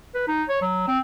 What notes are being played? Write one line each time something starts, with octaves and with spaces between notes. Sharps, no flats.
B4
D#4
C#5
F#3
C4